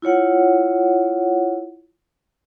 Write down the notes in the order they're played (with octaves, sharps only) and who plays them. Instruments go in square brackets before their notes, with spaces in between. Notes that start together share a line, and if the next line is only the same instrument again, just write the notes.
[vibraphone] E4 F4 C#5 F#5